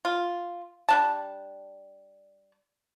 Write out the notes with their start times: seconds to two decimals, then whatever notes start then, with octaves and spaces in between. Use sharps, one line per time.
0.05 F4
0.89 G3 D4 A5